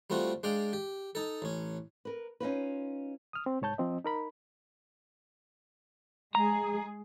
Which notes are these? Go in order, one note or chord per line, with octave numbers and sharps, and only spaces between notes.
G3 A3 C4 F4 F#4
G#3 D4 D5 F5 G5
G4
D#4 A4
A1 C#4
A#4 B4
C#4 D#4 F4 B4
D#6 F6
C4
C2 G#2 C#5 A5 G6
F3 C4 D#5
D#4 A#4 B5
G#3 G#4 A#5